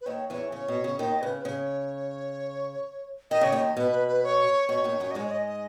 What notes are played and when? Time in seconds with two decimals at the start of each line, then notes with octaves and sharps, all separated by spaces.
0.01 B4
0.06 D#2 D#3 C#5
0.29 E2 E3 C#5
0.52 C#3 C#5
0.68 B2
0.84 C#3
0.99 D#2 D#3 D#5
1.22 C#3 B4
1.38 B4
1.45 C#3 C#5
3.31 D#3 D#5
3.41 C#3 C#5
3.52 D#2 D#3 D#5
3.77 B2 B4
3.92 B4
4.08 B4
4.23 C#5
4.69 B2 C#5
4.84 D#2 D#3
5.00 F#2 F#3
5.11 D#5
5.15 G#2 G#3 C#5
5.27 C#5
5.31 D#5
5.46 D#5